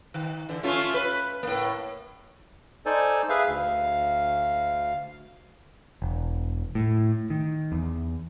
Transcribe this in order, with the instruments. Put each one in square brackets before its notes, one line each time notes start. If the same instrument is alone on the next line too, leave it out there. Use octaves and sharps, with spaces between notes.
[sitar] D#3
D3 E3
A3 C#4 F4
B4
A2 A#3
[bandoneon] D#4 A4 C5 D5 G#5
G#4 B4 E5 F5
D2 F5
[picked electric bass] E1
A2
D#3
E2